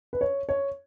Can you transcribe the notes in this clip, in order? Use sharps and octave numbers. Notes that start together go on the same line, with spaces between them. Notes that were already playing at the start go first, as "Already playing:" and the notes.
B4
C#5
C#5